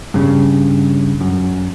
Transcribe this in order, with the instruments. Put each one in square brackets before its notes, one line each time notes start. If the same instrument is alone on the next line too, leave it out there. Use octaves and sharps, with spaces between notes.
[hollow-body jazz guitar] G2 C#3
F#2